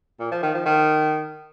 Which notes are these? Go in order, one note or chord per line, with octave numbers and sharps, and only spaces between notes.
A#2
F3
D#3
F3
D#3